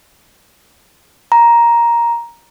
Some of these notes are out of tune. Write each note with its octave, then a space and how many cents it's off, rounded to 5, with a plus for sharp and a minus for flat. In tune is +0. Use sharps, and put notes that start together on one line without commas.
A#5 +10